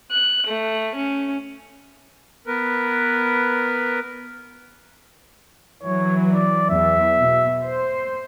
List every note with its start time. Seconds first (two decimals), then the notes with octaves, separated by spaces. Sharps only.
0.12 F#6
0.47 A3
0.95 C#4
2.46 B3 A#4 B4
5.83 E3 F#3 C#5
6.31 D5
6.70 E2 E5
7.19 B2
7.62 C5